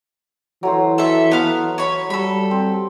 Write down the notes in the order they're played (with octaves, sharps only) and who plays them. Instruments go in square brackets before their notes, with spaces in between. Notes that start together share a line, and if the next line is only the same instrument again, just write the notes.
[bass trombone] E3 [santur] F#3 A3 C5
[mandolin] A4 E5
B3 F5
C#5 B5
[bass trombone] G3 [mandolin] A4 B5
[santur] C4